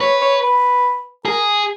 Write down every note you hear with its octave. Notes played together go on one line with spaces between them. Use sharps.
B4 C#5
C#5
B4
G#4 A#4